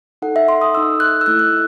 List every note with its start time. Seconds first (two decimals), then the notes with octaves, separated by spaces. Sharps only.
0.22 D#4 A4 F#5
0.36 E5
0.48 C6
0.61 D#6
0.74 D#4 A4 E6
1.00 F#6
1.21 E6
1.26 A3 E4 A4 F#6
1.39 F#6